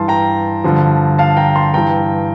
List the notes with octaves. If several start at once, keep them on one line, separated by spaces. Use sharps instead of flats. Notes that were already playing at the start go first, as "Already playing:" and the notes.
Already playing: G2 E3 A5 C6
G5 A#5
G2 D3 F3
F5 A5
G5 A#5
A5 C6
G2 E3 G5 A#5